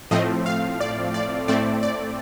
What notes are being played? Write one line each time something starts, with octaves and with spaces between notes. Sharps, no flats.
A2 F3 A3 C4 D#5
F5
D5
D5
A2 A3 C4 D5
D5